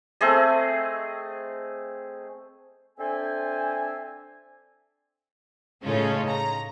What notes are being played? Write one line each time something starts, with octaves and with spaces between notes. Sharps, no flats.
A3 C4 G#4 D#5
C4 D4 A4 C5 E5 G#5
A2 C#3 C#4 D#4 F4 A4
A#5